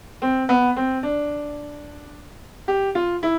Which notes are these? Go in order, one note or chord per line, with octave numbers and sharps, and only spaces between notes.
C4
B3
C4
D4
G4
F4
E4